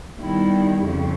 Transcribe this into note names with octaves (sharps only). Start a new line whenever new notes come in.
D#3 G3 B3 E4
F2 C#3